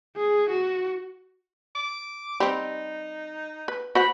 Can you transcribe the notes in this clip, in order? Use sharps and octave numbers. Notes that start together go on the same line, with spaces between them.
G#4
F#4
D6
G3 C4 D#4
B4
F#4 C5 F#5 B5